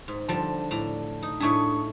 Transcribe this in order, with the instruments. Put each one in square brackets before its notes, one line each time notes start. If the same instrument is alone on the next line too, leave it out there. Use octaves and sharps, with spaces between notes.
[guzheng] G#2
[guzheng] D3 F3 G3 [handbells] A5
[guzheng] A2 D4 A#5
D#4
[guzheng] A2 A3 G#4 [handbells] D4 C#6